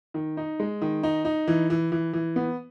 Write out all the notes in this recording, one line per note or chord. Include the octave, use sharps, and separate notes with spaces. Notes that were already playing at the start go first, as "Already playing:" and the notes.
D#3
D#4
G#3
D#3
D#4
D#4
E3
E3
E3
E3
B3